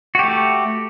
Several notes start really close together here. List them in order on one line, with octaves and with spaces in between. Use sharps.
F#4 G4 A3